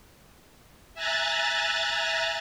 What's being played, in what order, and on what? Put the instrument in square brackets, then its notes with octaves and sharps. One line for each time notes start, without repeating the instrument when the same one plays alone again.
[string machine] E5 G#5 A#5 F#6 A6